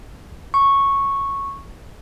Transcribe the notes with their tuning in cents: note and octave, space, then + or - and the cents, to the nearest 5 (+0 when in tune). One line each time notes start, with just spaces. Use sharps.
C#6 -5